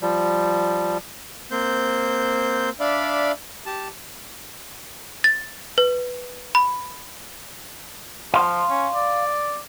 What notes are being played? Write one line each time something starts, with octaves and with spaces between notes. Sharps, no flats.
F3 G3
A#3 C4 C5 G6
D4 D5 E5 F5 B5
G4 A5
A6
B4
B5
F3 F5 C6
C#4
D5